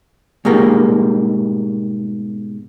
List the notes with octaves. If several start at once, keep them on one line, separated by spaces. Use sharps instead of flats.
G#2 B2 G3 A#3